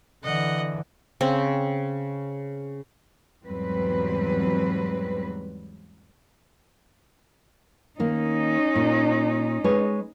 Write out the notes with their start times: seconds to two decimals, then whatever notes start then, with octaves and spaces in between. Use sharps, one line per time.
0.24 D3 E3 D#5 F#5
1.21 C#3 C4
3.46 E2 G#2 F#3 G3 C4 B4
8.00 D#3 A#3 C#4 D#4
8.76 A#2
9.64 G#3 B4 C#5